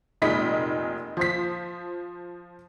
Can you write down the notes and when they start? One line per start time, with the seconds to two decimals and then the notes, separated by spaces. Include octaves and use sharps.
0.22 F1 A#2 G#3 D#4 B5 B6
1.17 F3 C5 B6